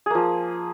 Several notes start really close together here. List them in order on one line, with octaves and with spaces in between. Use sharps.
G#4 A#3 F3